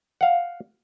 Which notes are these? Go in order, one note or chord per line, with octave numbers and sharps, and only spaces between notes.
F5 F#5